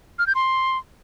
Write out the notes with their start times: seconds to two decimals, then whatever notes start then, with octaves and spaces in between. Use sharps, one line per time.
0.19 F6
0.27 G6
0.35 C6